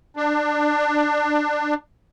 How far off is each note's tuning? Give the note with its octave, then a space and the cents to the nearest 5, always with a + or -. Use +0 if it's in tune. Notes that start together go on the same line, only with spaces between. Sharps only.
D4 +20